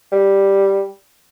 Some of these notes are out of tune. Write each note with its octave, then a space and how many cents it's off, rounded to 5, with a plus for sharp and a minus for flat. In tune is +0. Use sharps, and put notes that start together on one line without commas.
G3 +0